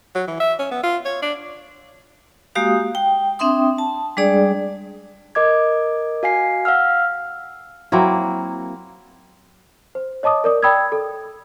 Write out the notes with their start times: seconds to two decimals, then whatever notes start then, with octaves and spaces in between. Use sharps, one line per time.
0.15 F#3
0.28 E3
0.40 E5
0.59 C#4
0.71 B3
0.83 F4
1.05 C#5
1.22 D4
2.55 G#3 A#3 F#4 G4 F5 D#6
2.95 G5
3.39 C4 D4 E5 G5 C6 D#6
3.78 A5
4.17 G3 G#3 D4 G#4 D5
5.35 A#4 D#5 D6 G#6
6.23 F#4 F5 G#5 C7
6.65 F5 F#5 E6 F6
7.92 F#3 A#3 C4 E4
9.95 C5
10.23 C#5 D#5 A5 D6 D#6
10.44 A#4 D5 D#6
10.63 D5 G5 B5 D#6 E6 G#6
10.92 A4